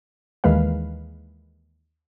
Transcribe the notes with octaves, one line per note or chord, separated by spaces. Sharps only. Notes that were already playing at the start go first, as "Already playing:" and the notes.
D#2 D#3 E3 G#3 B4 F5